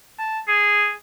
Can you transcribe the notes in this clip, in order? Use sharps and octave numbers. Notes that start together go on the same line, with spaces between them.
A5
G#4